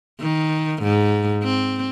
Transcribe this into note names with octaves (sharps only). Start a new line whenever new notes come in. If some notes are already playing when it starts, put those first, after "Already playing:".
D#3
G#2
C4